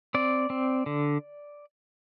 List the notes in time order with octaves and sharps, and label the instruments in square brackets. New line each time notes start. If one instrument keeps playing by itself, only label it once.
[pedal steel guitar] C4 D5
C4
D3